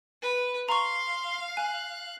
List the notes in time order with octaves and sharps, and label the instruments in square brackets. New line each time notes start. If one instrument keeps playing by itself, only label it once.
[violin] B4
[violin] F5 [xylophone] A#5 C#6 [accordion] C6
[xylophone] G#5 [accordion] F#6